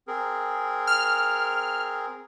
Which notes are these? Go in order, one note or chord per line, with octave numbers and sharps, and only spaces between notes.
C4 G#4 A#4
F6